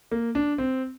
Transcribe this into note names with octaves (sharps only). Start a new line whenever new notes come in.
A#3
D4
C4